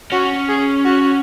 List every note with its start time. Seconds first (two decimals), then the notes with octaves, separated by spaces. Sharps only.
0.12 C#4 F#4
0.49 G#4
0.85 F#4